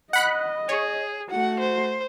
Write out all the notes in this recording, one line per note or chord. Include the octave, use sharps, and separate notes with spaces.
D#5 F#5 B5 F#6
G#4 C#5
A3 F#4 F#5
C5